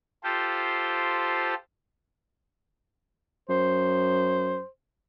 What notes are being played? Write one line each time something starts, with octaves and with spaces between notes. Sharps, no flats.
F4 G4 A4 C5
F#2 C5